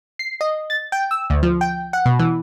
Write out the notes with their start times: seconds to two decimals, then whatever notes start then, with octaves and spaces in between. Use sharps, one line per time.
0.19 C7
0.41 D#5
0.70 A6
0.92 G5
1.11 E6
1.30 D2
1.43 F3
1.61 G5
1.93 F#5
2.06 B2
2.19 E3